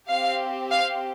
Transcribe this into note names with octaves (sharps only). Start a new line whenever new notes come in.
C4 G4 F5
F5